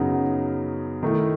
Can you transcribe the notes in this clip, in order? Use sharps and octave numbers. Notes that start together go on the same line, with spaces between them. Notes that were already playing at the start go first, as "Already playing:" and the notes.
Already playing: F#2 C#3 F#3 B3 D#4
D#3 A3 E4